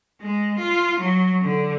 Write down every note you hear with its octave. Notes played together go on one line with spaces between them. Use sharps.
G#3
F4
F#3
D3